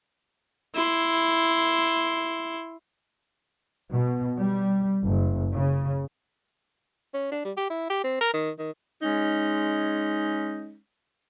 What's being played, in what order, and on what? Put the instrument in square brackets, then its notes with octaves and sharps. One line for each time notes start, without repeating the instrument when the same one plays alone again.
[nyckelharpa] E4 C6
[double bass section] B2
G3
F#1
C#3
[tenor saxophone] C#4
D4
G3
G4
E4
G4
C4
A#4
D#3
D#3
[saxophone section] G#3 C#4 D#4